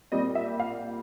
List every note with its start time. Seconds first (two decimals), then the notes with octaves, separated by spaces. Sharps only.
0.12 A#2 G3 C4 D#5
0.35 E5
0.60 F5